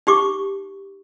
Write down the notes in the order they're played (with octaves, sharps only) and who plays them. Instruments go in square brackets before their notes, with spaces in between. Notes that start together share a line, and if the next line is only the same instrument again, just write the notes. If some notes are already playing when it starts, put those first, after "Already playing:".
[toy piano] D#4 G4 C#6 D6